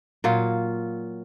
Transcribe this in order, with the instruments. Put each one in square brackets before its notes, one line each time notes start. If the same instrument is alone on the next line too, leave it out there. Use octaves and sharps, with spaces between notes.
[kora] A#2 F#3 F4